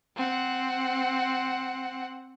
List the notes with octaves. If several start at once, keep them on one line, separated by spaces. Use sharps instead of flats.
C4 F#5